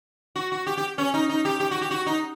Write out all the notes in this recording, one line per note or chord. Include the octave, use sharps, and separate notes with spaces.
F#4
F#4
G4
G4
C#4
D#4
D#4
G4
G4
F#4
G4
F#4
D#4